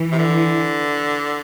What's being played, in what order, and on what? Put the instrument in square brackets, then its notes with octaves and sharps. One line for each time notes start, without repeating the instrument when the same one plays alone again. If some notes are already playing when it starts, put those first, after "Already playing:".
Already playing: [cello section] E3
[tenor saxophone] C3
D3